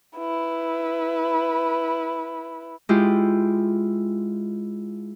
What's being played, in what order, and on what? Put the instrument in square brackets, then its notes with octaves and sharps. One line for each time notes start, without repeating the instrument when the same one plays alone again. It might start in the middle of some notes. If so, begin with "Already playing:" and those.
[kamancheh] E4 B4
[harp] G#3 E4 F4 G4